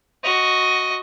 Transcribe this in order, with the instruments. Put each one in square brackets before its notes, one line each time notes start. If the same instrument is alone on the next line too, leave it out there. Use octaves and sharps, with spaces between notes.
[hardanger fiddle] F#4 D#5